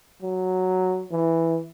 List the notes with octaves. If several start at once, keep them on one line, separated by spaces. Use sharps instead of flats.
F#3
E3